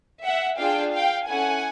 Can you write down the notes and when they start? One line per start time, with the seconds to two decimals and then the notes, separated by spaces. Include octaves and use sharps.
0.24 E5 F#5
0.58 D4 F4 G#4 F5 G5
0.93 F5 G5
1.28 C#4 E4 A4 F#5 G#5